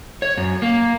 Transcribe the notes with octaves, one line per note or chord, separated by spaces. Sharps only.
C#5
F#2
A#3